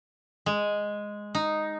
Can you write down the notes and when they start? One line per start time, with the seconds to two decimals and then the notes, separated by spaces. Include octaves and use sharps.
0.46 G#3
1.35 D#4